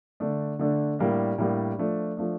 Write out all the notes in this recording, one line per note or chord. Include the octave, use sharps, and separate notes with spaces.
D3 A3 D4
D3 A3 D4
A2 G3 A#3 D4
A2 G3 A#3 D4
F3 A3 D4
F3 A3 D4